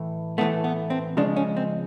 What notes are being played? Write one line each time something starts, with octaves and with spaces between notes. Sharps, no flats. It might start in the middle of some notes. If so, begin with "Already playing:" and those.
Already playing: A2 E3 A3
A2 E3 A3 B3
B3
C4
C#3 F3 G#3 D4
C#4
C4